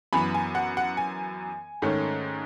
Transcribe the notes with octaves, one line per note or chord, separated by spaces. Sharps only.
F#2 E3 B3 G#5 B5
G#5
F#5
F#5
G#5
G#2 D#3 A3 C#4